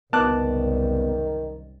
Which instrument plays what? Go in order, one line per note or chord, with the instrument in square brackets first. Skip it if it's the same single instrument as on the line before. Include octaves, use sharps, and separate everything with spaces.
[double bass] F#1 C2 [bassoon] D#3 [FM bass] B3 [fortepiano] A5 D6 F#6